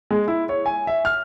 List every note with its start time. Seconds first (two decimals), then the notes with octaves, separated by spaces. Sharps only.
0.11 G#3
0.28 E4
0.49 C#5
0.66 G#5
0.87 E5
1.05 F6